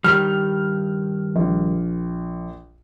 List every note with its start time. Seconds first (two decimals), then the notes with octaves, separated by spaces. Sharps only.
0.04 G2 D#3 G3 F6
1.36 A#1